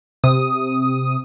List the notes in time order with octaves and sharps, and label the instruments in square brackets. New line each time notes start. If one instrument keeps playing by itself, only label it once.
[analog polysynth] C3 D#6